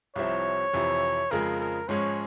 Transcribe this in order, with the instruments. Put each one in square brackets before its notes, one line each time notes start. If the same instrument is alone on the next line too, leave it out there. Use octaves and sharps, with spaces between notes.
[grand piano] C2 C3 F3 C4 E4 [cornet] C#5
[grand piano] F2 C3 E3
[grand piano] F2 C#3 F3 G#3 [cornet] A#4
[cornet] A#4
[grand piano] G#2 F3 G#3 C#4 [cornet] C#5